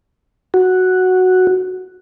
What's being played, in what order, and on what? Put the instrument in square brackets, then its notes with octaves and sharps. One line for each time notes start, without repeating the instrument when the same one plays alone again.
[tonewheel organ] F#4